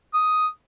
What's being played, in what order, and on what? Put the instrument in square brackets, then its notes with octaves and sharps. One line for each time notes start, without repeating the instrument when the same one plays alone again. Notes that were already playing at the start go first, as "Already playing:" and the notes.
[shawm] D#6